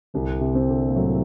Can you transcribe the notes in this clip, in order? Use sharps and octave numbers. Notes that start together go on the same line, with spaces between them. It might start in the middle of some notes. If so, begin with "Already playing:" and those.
C2 D3
C3
C4
D3
A#3
A2 F#3 A3